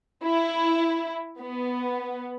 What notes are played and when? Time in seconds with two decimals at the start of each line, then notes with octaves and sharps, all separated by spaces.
0.25 E4
1.39 B3